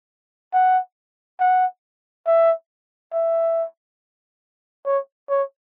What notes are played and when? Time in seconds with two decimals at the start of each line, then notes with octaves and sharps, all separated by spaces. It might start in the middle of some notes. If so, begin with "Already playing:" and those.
0.53 F#5
1.40 F#5
2.27 E5
3.13 E5
4.85 C#5
5.29 C#5